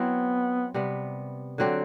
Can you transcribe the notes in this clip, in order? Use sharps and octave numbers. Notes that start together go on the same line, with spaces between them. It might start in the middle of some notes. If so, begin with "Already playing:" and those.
Already playing: F#3 B3 C4 E4
C3 G3 B3
D3 F#3 C4 G4